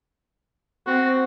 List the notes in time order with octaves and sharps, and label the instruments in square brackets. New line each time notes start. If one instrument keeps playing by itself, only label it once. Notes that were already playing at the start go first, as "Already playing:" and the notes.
[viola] C4 [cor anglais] F#4